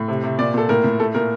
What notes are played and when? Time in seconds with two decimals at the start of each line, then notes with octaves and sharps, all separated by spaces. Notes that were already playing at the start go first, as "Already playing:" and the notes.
Already playing: A2
0.08 C3
0.24 C3
0.39 A#2 D5
0.54 A#2 A4
0.69 A2 A#4
0.84 A2
0.99 A3 A4
1.15 A#2 A#4